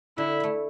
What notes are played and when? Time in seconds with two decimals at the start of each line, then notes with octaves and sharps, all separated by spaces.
0.18 D3 E4
0.40 A3 E4